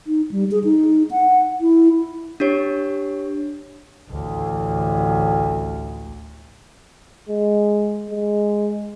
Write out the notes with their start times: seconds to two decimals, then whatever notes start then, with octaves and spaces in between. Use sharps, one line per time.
0.07 D#4
0.31 G3
0.51 G#4
0.64 D#4
1.11 F#5
1.61 E4
2.40 D4 G4 C#5
4.10 A1 D2
7.29 G#3
8.10 G#3